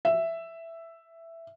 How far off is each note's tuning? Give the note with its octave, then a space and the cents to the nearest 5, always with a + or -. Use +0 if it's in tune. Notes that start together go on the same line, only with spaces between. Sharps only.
E5 +5